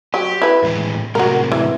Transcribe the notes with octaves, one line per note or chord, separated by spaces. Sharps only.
F#3 G4
E4 B4
A2 E3 G#3
A2 C3 G#3 F#4 A#4
E3